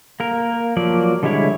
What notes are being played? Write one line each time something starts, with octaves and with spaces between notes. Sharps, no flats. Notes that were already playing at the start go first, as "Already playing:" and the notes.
A#3 A#4
F3 F#3 A#3 D5
D3 G3 G#3 E4 C#5